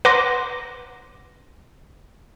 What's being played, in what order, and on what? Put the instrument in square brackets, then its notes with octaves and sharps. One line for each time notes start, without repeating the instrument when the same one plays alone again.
[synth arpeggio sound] B4 F#5 A#5 C6 D6 A#6